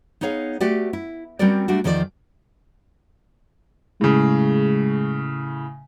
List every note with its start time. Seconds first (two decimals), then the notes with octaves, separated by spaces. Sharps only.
0.21 B3 D#4 G#4 C#5 F5
0.60 A3 F#4 G4 B4 D5
0.93 E4
1.39 G3 C4 C#4 F#4 A#4 D5
1.68 G3 A3 D4 F#4
1.84 E2 D#3 F3 B4 D5
4.01 A2 C#3 G#3